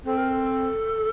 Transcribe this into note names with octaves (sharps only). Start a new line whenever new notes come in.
C4 A4
A#4
A4